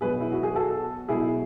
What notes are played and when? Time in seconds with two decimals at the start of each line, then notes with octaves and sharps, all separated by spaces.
0.01 B2 F#3 G#4 B4
0.20 E4
0.32 F#4
0.43 G#4
0.55 F#4 A4
1.09 B2 F#3 E4 G#4